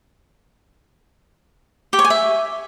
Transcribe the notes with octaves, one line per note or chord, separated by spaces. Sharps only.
G4
C#5
G#5
E5